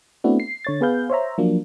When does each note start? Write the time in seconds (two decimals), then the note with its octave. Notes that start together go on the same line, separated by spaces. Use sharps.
0.24 A3 B3 C4 D4 E4 F#4
0.40 C7
0.65 D3 C#5 A6
0.81 B3 G#4 B4 F5 G6
1.10 C5 C#5 E5 A#5
1.38 F3 F#3 A#3 D4